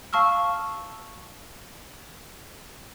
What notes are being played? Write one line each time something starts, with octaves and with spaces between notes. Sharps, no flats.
F5 A5 C#6 E6 F6